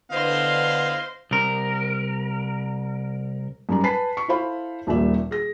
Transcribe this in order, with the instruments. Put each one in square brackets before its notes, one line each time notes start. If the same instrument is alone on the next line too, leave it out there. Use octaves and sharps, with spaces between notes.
[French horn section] D3 B3 [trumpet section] E4 D#5 F5 [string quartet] C5 C6
[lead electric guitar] C2 A#4
[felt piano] F#2 G3 A#5
B4 G#5 A5 B5 B6 C7
C#6
E4 A4 C5 F5 B5
D#1 A#1 A#2 G3 E5
G#4 A#6